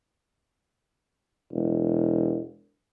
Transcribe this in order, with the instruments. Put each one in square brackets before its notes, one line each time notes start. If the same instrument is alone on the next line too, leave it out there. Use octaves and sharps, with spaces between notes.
[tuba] E1